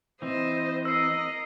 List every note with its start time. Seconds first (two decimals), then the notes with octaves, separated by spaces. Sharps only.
0.22 E3 C4 C5 D#5
0.85 A#4 D#5 E6 C7